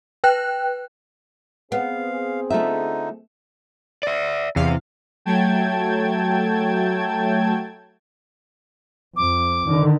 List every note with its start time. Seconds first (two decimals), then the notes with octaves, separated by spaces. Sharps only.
0.24 B4 G5 F#6
1.72 B3 C4 G#4 F5
2.50 D3 A3 D#4 F4 E5
4.03 D5 E5
4.56 E2 C3 F5
5.25 F#3 A3 G5 A5 G#6
9.16 F2 D6
9.67 D3 D#3